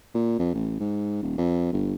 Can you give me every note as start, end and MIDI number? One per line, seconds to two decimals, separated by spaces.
0.14 0.39 46
0.39 0.53 41
0.54 0.79 33
0.80 1.19 44
1.22 1.38 27
1.38 1.71 41
1.72 1.94 31